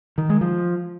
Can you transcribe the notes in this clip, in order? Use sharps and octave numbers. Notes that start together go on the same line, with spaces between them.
D#3
G#3
F3